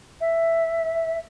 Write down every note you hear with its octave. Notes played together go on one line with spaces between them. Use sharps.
E5